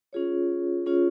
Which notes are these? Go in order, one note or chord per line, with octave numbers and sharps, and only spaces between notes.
C#4 F4 G#4 C#5
C#4 F4 G#4 C#5